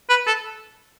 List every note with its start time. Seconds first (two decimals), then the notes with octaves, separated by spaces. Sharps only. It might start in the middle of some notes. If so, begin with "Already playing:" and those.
0.10 B4
0.27 A4